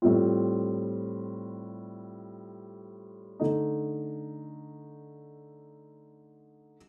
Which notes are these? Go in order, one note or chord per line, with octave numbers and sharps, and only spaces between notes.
A2 G3 C4 F4
D3 A3 D#4